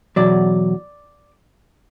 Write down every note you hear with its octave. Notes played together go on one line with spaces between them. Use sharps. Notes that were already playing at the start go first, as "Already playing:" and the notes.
E2 B2 F#3 D5